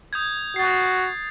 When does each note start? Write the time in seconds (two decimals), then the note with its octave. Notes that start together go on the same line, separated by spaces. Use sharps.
0.13 D#6 G6 G#6
0.56 F#4 A6 C7